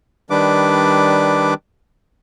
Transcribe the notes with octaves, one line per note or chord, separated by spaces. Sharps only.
D#3 G3 D4 B4 D6